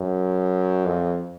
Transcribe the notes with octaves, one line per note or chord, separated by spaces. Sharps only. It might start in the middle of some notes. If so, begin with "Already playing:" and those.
Already playing: F#2
F2